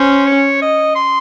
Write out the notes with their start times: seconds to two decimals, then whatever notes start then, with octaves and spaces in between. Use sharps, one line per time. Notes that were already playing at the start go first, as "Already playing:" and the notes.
Already playing: C#4 C5
0.27 C#5
0.62 D#5
0.95 C6